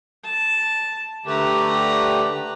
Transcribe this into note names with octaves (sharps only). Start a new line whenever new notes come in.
A5
D3 A3 G4 B4 A#5